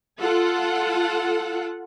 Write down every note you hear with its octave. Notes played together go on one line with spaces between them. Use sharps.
F4 A4 F#5